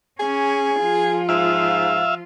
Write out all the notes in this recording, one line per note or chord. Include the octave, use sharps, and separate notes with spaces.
C#4 G#4
F3 F4
G#2 E5 F5